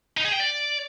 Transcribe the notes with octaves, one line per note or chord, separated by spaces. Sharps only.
D#4
G#4
G5
D5